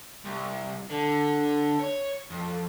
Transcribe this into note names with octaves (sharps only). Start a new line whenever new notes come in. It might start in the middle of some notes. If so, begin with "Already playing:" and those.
C2
D3
C#5
F2